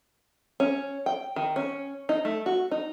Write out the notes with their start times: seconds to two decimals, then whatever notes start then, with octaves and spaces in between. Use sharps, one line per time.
0.60 C#4
1.06 G5
1.36 D#3
1.56 C#4
2.09 D#4
2.25 A3
2.46 F#4
2.71 D#4